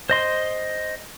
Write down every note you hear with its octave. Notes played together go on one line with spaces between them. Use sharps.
C5 D#5 C6